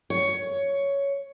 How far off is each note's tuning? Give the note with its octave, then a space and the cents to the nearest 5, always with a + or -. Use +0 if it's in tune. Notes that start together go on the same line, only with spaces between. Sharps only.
C#5 +10